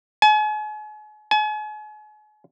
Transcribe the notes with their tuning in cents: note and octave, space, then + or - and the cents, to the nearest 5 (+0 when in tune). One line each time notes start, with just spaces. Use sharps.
G#5 +40
G#5 +40